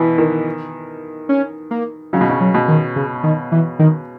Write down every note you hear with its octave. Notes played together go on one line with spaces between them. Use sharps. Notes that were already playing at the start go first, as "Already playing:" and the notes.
Already playing: B2 E3
D#3
C#4
A#3
C#3 F#3
B2
C#3
F#3
B2
D#3
C#3
D#3
E3
D#3